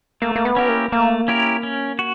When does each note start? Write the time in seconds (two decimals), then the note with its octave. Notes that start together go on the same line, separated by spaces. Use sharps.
0.22 A3 A#3
0.36 A#3
0.45 B3
0.56 C#4 E4 G4 A#4
0.69 A#3
0.92 A3 A#3
1.28 C#4 E4 G4 A#4
1.63 C#4
1.99 F#4